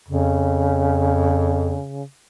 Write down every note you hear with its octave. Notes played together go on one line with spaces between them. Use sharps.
F2 C#3